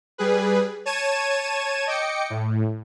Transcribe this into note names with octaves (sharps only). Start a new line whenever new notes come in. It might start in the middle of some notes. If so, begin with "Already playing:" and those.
G3 G#4 B4
C#5 A5 G#6 D#7 E7
D#5 G5 D6 C#7
A2